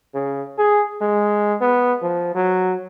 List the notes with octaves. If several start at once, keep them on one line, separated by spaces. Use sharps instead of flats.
C#3
G#4
G#3
B3
F3
F#3